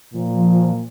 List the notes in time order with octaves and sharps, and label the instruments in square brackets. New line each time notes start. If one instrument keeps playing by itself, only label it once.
[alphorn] A#2 [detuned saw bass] F3